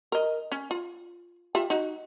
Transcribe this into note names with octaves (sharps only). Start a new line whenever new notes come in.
A#4 D#5
C#4
F4
F4 G4 E5
D#4 F#4